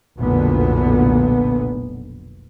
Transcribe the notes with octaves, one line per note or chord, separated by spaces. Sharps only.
F1 B1 A#2 D3 B3